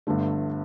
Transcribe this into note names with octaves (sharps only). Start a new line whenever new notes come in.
G1 G2 D3 A3